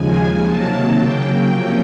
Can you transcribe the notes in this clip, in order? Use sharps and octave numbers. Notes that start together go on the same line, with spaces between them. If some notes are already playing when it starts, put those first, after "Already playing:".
Already playing: D#2 C#3 F3 G#3 G#5
C3 D#3 F#3 A#3 A5
C#3 F#3 A#3 G5
C3 F3 A#3 C#4